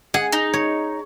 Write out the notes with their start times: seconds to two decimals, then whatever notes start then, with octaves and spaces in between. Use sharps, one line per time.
0.14 G#4 F#5
0.32 D#4
0.53 C#5